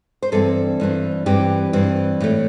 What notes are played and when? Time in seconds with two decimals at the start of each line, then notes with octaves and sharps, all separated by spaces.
0.22 C5
0.32 G2 E3 C4 A4
0.80 G2 E3 C4
1.26 G2 E3 C4 G4
1.73 G2 E3 C4
2.20 A2 E3 A3